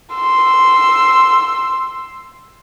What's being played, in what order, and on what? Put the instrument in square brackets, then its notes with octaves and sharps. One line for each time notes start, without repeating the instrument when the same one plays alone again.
[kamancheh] C6 E6